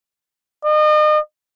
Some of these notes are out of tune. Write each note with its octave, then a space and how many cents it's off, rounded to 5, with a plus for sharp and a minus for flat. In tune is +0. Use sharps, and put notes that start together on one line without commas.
D#5 -35